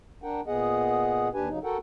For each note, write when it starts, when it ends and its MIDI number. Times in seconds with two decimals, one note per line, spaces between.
0.23 0.41 62
0.23 0.41 70
0.23 0.41 78
0.23 0.41 79
0.47 1.28 46
0.47 1.28 59
0.47 1.28 68
0.47 1.28 75
0.47 1.28 78
1.34 1.49 39
1.34 1.49 62
1.34 1.49 67
1.34 1.49 71
1.34 1.49 80
1.49 1.59 49
1.49 1.59 54
1.49 1.59 63
1.64 1.77 66
1.64 1.77 69
1.64 1.77 70
1.64 1.77 78
1.64 1.77 79